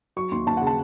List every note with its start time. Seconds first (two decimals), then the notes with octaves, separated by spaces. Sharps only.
0.16 F#3 C#6
0.32 D#2 C6
0.47 D#2 A5
0.57 F#5
0.61 C#3
0.67 A5